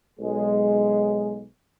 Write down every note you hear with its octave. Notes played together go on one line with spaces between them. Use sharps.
B1 G#3